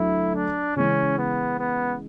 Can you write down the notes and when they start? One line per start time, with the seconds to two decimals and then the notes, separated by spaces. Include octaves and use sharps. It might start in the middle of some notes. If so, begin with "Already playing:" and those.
Already playing: D2 F#3 A3 E4
0.35 D4
0.76 C#3 E3 G#3 C#4
1.18 B3
1.59 B3